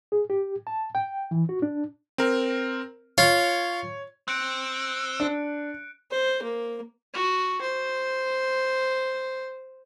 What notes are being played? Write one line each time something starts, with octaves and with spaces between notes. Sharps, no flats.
G#4
G4
A5
G5
E3
F#4
D4
C4 A#4
F4 C#5
C4 F#6 C#7 D7
D4
C5
A#3
F#4
C5